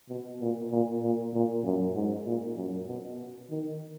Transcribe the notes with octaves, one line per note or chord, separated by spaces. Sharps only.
B2
A#2
A#2
A#2
A#2
F#2
G#2
A#2
F#2
B2
D#3